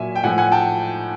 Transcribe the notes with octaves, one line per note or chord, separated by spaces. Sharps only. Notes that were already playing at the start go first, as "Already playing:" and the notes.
Already playing: A#2 F#3 E5 G#5
G5
A2 F3 F#5 G#5
F#5 G#5
G5 A5